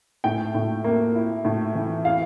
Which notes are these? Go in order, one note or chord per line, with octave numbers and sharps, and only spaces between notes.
A2 G5
A2
A#3
E4
A2
E3
E4 F5